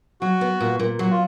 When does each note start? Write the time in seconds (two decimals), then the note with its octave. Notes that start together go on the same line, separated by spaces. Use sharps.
0.21 F#3 F#4
0.41 B3
0.60 A#2
0.79 A#2
0.99 F#3 F#4
1.11 F4